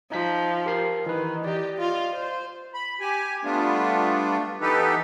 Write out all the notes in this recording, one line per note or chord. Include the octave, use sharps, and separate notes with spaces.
F3 D#4 B6
G4 A#4 C7
D#3 E3 B4
G4 D5 D#5
F4
C5
B5
G4 G#5
G3 A3 B3 D4 F4
E3 B3 D#4 G4 A4 B4